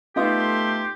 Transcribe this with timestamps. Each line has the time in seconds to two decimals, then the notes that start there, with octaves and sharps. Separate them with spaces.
0.16 A3 B3 D#4 F4 G4 C6